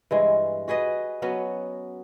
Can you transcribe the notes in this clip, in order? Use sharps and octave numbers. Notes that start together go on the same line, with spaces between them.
G2 E3 G#3
F#4 G#4 B4 D#5
F#3 B3 C#4 F#4